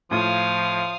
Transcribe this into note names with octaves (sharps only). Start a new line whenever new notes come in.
A2 F3 F4 F5 D#6